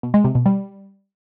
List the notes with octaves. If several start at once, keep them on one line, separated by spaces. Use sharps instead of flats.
B2
G#3
C3
B2
G3